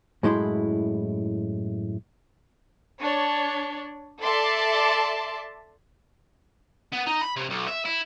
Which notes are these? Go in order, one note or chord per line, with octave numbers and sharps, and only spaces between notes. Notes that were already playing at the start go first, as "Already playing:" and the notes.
F#2 A2 G#3 E4 C6
D4 C#5
A4 D5 E5 A5 C6 D6
B3
D#4
B5
C3
B1
E5
E4